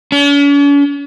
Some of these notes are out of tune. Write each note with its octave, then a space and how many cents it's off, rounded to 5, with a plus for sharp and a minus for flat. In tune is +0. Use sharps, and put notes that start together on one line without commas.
C#4 +45